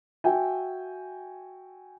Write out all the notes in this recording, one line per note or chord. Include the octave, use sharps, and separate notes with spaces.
F#4 E5 G5 G#5